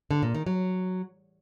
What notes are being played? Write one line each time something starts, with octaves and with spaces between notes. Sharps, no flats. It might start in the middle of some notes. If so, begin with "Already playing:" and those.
D3
A#2
D#3
F#3